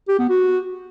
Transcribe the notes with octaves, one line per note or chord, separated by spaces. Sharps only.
G4
B3
F#4